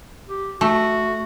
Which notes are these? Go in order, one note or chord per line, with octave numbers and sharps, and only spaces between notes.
G4
A3 F#4